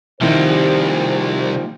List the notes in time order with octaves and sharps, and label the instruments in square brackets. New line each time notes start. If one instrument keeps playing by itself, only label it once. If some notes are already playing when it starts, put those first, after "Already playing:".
[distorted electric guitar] C2 C3 [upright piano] D#3 E4 [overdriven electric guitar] F3 A#3 [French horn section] G4 C5